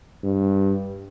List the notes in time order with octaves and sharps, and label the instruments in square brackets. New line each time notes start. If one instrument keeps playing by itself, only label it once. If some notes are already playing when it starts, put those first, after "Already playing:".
[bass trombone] G2